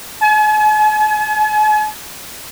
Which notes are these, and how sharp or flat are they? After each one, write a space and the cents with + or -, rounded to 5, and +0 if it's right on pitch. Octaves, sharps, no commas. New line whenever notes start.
G#5 +45